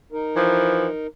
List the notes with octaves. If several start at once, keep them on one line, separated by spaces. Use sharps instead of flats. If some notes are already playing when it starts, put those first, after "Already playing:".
D#4 A#4
E3 F3